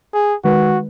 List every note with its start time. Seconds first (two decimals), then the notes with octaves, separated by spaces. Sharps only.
0.14 G#4
0.44 D#3 G#3 F#4 B4